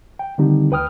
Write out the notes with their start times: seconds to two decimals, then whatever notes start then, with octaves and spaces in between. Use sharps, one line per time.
0.19 G5
0.38 D3 D#3 G3 C4 D#4 G4
0.71 D2 B4 G5 D#6 F6